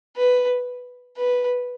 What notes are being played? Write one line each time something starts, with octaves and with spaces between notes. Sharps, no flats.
B4
B4